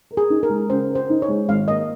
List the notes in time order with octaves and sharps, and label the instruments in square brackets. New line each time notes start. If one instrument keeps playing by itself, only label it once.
[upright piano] A#4
[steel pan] G#4
[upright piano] D#4
[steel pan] A#4
[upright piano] G#3
[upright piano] C#3 [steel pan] C5
[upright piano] A#4
[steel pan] C5
[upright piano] D#4
[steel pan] C#5
[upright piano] G#3
[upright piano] G#1 [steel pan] F5
[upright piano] A#3 [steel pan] D#5